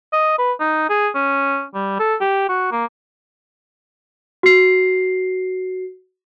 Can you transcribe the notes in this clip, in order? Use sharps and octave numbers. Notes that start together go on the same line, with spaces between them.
D#5
B4
D#4
G#4
C#4
G3
A4
G4
F#4
A#3
F#4 C7